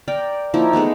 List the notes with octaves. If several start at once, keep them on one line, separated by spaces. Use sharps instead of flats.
A#4 D5 G5
F3 A#3 D#4 E4
G#3 A3 B3 D#4